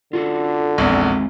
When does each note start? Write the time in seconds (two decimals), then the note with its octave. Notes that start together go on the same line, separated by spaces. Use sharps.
0.13 D3 F4 F#4 A4
0.78 A#1 E2 G#3 C4 F#4